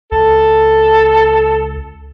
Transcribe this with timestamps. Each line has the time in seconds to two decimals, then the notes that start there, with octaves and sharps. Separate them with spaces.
0.12 C#2 A4